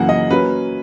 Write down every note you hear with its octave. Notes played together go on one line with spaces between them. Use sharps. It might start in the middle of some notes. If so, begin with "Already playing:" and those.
Already playing: F#2 C#3 E3 A#3 F#5
D#5
F#3 A#3 C#4 B4